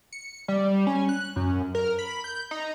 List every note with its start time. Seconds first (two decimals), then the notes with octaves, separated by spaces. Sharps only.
0.12 C#7
0.48 G3
0.87 C#4
1.09 F#6
1.36 F#2
1.75 A#4
1.99 B5
2.24 G6
2.51 D#4